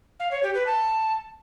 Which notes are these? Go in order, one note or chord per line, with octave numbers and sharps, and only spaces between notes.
F5
C#5
G4
B4
A5